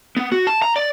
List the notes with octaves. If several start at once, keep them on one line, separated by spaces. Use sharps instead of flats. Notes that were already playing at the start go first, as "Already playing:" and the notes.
B3
F#4
A5
A#5
D5